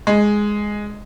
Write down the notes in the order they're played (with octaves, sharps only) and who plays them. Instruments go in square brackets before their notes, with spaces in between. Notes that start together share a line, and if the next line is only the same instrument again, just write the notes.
[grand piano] G#3